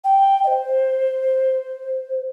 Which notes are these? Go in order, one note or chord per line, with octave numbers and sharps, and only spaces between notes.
G5
D#5
C5